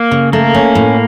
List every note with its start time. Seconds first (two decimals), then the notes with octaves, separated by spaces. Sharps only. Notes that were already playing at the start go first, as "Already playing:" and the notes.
Already playing: A#3
0.11 C#3
0.33 A3 A#3
0.55 C#4
0.75 A2